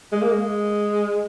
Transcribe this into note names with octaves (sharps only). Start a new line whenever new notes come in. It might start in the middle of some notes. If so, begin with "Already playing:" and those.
G#3
A#3
G#3